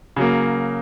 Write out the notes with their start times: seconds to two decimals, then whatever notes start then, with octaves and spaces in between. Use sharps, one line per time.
0.16 C#3 F#3 A#3